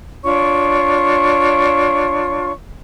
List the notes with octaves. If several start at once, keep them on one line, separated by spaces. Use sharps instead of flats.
D4 F4 C#5 C#6